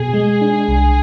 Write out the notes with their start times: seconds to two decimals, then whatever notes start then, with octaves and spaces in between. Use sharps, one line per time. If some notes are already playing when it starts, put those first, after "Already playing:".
Already playing: B2 G#4
0.14 G#3
0.41 D4
0.68 C2